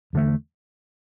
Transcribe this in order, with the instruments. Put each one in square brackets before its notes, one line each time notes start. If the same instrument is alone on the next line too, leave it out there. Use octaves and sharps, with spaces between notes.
[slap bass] E2 D3 A3